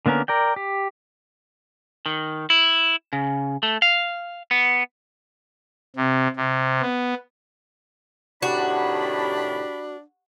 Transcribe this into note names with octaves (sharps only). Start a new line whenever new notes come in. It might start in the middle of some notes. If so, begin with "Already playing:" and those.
D3 A#3 B3 C#4 A#4
A#4 D5 G5
G4
D#3
E4
C#3
A3
F5
B3
C3
C3
B3
A2 C3 D#3 D4 F#4 G4 A5 B5